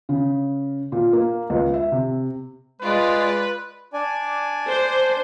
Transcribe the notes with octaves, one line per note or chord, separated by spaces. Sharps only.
C#3
A#2
A#3
C#2
E5
C3
G#3 F4 B4 D5
D4 D5 G#5
C5